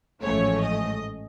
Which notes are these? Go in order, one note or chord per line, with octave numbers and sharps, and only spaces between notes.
A1 G#2 F3 A3 C#4 C#5
D#5